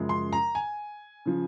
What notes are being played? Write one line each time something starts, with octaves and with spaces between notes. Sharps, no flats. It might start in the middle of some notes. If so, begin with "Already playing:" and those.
Already playing: F#2 C#3 F3 G#3
C6
A#5
G#5
C#3 F3